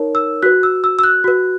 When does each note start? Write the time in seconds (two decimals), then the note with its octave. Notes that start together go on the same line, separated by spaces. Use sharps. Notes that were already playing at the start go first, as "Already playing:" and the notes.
Already playing: D#4 A#4 C#5
0.15 E6
0.43 F#4 B4 F#6
0.63 E6
0.84 E6
0.99 E6
1.04 F#6
1.24 F#4 B4